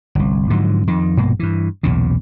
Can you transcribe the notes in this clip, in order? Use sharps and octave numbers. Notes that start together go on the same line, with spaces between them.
G1 C2
G#2 D3 F3 F#3
F2 D#3
A#1 G2 B2 A#3
G2 E3
B1 E2 A#2 C#3